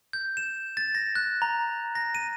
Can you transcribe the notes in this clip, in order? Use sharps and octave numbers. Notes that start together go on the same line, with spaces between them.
G6
E7
A6
A#6
F#6
A#5
A#6
D#7